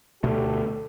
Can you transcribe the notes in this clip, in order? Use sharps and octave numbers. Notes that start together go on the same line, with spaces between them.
D2 B2 A3 F#4 G4 A4